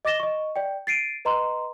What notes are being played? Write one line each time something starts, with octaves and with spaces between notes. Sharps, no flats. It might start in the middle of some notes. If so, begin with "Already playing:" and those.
D#5 D6 A6 A#6 E7 G7
D#5 C#6
D5 G5
A6 C7 D7 D#7
B4 D#5 A#5 C6